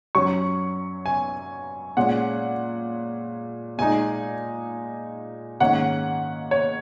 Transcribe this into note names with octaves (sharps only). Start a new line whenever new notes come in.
F#2 F#3 C#4 C#6
G#5
A#2 G#3 C#4 F#5
A#2 G#3 D#4 G#5
G#2 D#3 A#3 C#4 F#5
C#5